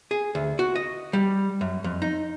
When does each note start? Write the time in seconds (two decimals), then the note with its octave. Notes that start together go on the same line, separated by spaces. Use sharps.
0.11 G#4
0.35 D2
0.59 F#4
0.76 D#5
1.13 G3
1.61 F#2
1.84 F2
2.02 D#4